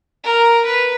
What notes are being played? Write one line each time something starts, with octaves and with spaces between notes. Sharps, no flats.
A#4
B4